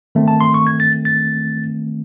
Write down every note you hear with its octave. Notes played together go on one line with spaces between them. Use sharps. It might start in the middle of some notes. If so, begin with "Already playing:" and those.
D#3 A3 C4
A5
C6
C#6
G#6
A6
A6